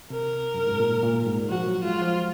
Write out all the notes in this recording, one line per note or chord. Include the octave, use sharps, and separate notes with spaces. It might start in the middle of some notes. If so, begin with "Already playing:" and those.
C3 A#4
F#2
G#2
A#2
A#2
G#2
F3 F#4
F#3
G#3 F4
F3